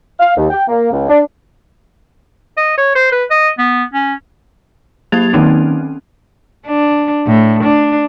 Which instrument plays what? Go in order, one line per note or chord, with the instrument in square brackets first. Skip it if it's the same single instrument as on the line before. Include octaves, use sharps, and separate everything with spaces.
[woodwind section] F5
D#2
G5
A#3
C#2
D4
[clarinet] D#5
C#5
C5
B4
D#5
B3
C#4
[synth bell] F#3 A#3 G4 G#6 A6 F7
D#3 A#3 C4 C#4 D#4
[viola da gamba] D4
A2
D4